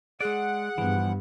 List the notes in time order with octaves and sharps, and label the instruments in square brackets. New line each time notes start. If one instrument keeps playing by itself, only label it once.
[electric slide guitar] G#3 D5 [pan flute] G#4 [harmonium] F#5
[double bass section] G2 B3 [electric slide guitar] E3 F3